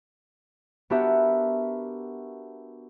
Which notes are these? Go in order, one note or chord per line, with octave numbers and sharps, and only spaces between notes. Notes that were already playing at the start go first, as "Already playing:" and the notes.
B3 D4 F#4 G4 A#4 E5